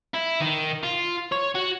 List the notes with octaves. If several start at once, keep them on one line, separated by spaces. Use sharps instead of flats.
E4
D#3
F4
C#5
F#4